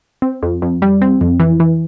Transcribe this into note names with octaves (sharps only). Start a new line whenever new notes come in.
C4
F2
F2
G3
C4
F2
E3
E3